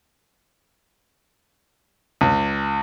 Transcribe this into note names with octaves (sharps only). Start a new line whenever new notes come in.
C#2